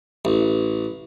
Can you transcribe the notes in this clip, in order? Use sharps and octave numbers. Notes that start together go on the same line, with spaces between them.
A1